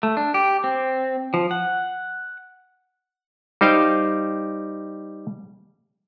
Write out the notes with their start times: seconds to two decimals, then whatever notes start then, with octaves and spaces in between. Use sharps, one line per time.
0.03 A3
0.17 D4
0.34 G4
0.64 C4
1.34 F3
1.51 F#5
3.61 G3 D#4 C5 F5 G5